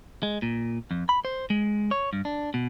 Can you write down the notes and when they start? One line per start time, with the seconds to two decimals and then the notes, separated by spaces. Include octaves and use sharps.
0.23 G#3
0.42 A#2
0.91 F2
1.09 B5
1.25 C5
1.50 G#3
1.91 C#5
2.13 G2
2.25 D4
2.54 B2